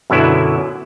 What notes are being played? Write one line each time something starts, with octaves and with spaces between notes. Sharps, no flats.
F#2 B2 D3 F#3 E4